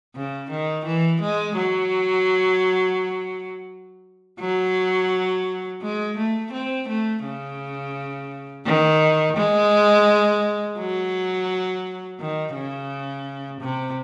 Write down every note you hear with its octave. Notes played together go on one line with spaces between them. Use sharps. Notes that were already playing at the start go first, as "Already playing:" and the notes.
C#3
D#3
E3
G#3
F#3
F#3
G#3
A3
C4
A3
C#3
D#3
G#3
F#3
D#3
C#3
C3